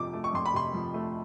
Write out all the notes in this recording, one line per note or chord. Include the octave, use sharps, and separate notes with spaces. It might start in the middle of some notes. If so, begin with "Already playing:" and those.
Already playing: F2 C3 F3 A3 D6
A3
C#6
F2 C6
B5
C3 C6
F3
A3